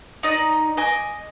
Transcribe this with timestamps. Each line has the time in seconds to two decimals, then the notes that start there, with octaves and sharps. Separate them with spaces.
0.23 D#4 D5 D#5
0.77 D#5 G#5 D6